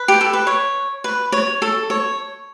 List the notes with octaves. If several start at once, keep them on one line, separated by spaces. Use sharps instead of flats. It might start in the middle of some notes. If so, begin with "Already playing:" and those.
Already playing: B4
G4
A4
B4
C#5
B4
C#5
A4
C#5